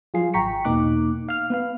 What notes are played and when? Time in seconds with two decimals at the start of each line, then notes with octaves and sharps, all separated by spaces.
0.14 F3 F#3 F4 G#4 C7
0.34 G#1 G5 A#5 C#6 B6 C#7
0.65 E2 B2 A#3 D#4 D6 F#6
1.29 F5 F6
1.50 B3 B4 F5